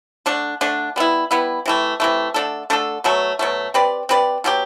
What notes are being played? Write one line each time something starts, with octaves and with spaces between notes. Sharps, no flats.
D3 A3 D4
D3 A3 D4
G3 B3 E4
G3 B3 E4
C3 E3 A3
C3 E3 A3
D3 A3 D4 A4
D3 A3 D4 A4
B2 F#3 A3
B2 F#3 A3
C4 G4 B4 D5
C4 G4 B4 D5
B2 F#3 C4 G4